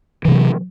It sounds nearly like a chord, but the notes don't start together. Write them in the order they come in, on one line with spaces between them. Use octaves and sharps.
E3 C3 A3 F#3